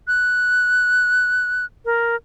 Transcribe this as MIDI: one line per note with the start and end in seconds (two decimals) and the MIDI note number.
0.08 1.65 90
1.85 2.16 70